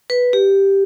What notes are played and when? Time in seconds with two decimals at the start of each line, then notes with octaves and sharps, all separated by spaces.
0.10 B4
0.33 G4